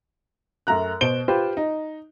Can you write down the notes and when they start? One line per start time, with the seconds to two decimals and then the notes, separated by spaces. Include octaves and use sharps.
0.67 F#2 A3 A#5 F#6
1.01 B2 C5 D7 G7
1.28 F4 G4 B4 C5
1.57 D#4